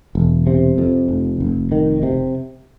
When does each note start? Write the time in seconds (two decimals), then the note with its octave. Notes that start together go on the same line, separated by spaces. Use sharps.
0.15 E1
0.47 C3
0.78 F2
1.09 F1
1.40 F1
1.72 D#3
2.03 C3